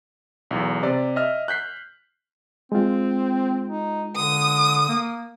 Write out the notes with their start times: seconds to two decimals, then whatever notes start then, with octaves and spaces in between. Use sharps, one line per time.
0.51 B1 E2
0.83 C3 D5
1.16 D#5 E5 F6
1.48 F#6 G6 B6 C7
2.72 G#3 C4 F4
3.68 D#4
4.16 D3 D#6
4.89 A#3